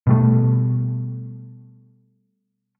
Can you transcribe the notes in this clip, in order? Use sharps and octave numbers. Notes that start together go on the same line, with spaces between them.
B2 G3 A3